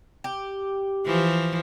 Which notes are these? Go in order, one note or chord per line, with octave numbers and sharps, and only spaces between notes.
G4
E3 F3